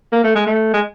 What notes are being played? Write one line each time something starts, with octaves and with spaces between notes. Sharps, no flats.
A#3
A3
G#3
A3
G#3